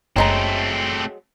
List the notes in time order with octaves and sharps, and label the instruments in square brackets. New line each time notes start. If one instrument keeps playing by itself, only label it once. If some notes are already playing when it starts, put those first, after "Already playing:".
[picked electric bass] F#1 [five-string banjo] F#3 G#3 A#5 [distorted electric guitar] A3 C4